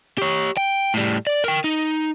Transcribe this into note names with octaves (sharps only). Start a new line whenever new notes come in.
G4 C#5
G5
A2 G3
D5
A#4 G5
D#4